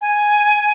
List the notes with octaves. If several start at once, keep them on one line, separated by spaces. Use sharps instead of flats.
G#5